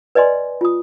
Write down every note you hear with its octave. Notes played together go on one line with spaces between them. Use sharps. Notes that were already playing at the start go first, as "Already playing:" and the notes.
B4 D5 D#5 G#5 C6
F4 D#6